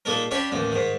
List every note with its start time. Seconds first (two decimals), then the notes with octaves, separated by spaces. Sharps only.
0.05 A#2 G#3 D#4 A4 A#4
0.31 C#4 D4 G4 C#5 F5 B5
0.52 A1 D#2 D3
0.72 G#2 D#3